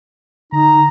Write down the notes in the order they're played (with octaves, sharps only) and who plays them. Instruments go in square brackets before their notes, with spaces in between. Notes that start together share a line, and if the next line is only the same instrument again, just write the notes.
[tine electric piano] D3 [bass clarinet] D#4 [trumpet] A#5